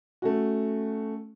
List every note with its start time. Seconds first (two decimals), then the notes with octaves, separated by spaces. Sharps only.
0.22 A3 C#4 F#4